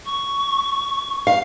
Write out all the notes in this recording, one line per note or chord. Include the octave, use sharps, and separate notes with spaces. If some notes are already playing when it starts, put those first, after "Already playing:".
C#6
F5